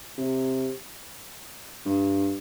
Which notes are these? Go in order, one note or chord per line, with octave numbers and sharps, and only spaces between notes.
C3
G2